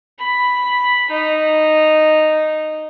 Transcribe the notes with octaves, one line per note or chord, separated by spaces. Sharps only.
B5
D#4